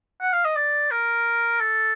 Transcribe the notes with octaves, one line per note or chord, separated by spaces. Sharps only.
F#5
F5
D#5
D5
A#4
A4